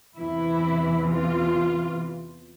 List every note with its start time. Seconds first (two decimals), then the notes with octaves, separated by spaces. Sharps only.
0.17 E2 C3 E3 E4
1.09 F4